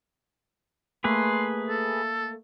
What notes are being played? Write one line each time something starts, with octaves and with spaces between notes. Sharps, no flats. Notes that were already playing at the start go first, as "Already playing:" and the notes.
A3 A#3 G#4 B4 C6
A4